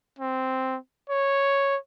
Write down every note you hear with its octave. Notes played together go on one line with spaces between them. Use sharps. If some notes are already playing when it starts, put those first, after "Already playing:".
C4
C#5